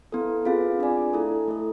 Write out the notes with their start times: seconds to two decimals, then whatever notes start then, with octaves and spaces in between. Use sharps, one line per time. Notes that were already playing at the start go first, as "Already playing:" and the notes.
0.12 B3 E4 A4
0.45 C4 F4 G#4 B4 F5
0.79 D4 F4 G#4 D5 G#5
1.13 A3 E4 A4
1.48 A3 E4 A4